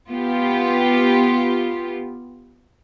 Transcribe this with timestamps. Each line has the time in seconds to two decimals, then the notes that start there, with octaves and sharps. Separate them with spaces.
0.10 B3 F4 G4